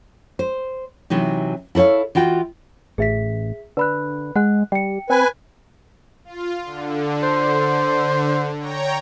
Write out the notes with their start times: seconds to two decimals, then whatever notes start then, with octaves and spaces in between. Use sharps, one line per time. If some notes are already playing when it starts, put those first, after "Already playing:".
0.39 C5
1.10 C3 E3 F#3 D#4
1.75 E4 A4 C5 C#5 F5
2.15 E3 F4 F#4 G5
2.98 A1 G#4 E5 B6
3.77 D3 B4 B5 F#6
4.36 G#3 F#5 F#6
4.72 G3 G5 C#7
5.10 C4 B4 G#5
6.25 F4
6.65 D3
7.23 C5
8.59 C#5 G5 A#5